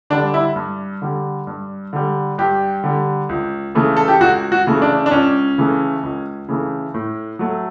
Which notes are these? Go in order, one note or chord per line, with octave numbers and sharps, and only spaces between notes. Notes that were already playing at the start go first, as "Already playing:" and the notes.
D3 G3 D4
E4
G2
D3 G3
G2
D3 G3
G2 G4
D3 G3
C#2
C#3 E3 A3
A4
G4
C#2 F#4
F#4
C#3 E3 A3
D4
D4
C#2 C#4
C#3 E3 A3
C#2
C#3 E3 A3
A2
F#3 A3